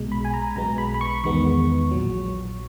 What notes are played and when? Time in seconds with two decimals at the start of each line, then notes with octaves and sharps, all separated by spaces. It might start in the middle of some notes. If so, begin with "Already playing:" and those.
Already playing: B1 B2 G#3
0.12 B5
0.25 G#5
0.34 A#5
0.56 B1 B2 G#3 B3 A#5
0.78 B5
0.94 B5
1.01 C#6
1.24 E2 D#3 G#3 B3 C#6
1.91 A#1 A#2 F#3